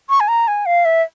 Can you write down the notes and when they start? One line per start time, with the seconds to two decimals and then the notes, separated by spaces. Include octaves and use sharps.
0.09 C#6
0.20 G#5
0.28 A#5
0.48 G#5
0.66 F5
0.85 E5